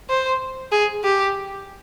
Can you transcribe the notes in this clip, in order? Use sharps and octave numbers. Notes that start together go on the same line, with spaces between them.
C5
G#4
G4